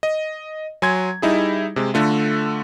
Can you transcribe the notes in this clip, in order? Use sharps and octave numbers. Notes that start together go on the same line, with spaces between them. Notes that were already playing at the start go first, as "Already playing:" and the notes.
D#5
F#3 G#5 C6 G#6
G3 D#4 E4 G#4
C3 G#3
D3 A3 F4